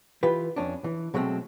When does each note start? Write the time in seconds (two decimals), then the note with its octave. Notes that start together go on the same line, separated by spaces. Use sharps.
0.23 E3 F4 G4 B4
0.56 F2 C#4 D4
0.84 E3
1.14 B2 F#3 G#3 A3 B3 C4